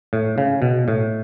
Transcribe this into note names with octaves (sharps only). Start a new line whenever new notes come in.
A2
C#3
B2
A2